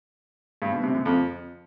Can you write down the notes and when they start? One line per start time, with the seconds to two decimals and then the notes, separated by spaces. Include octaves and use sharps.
0.62 G2
0.73 B2
0.84 C3
0.95 F#2
1.05 F2